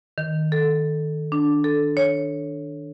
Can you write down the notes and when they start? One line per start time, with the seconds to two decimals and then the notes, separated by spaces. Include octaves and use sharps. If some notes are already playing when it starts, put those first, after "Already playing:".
0.18 D#3
0.52 A4
1.32 D4
1.64 A4
1.97 C#5